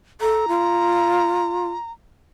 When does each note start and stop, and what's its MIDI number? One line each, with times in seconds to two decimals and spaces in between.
0.21 0.46 69
0.21 1.91 82
0.48 1.69 65